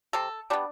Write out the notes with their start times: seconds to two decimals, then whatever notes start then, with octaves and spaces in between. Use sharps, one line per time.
0.13 C3 A4
0.50 G3 B3 D4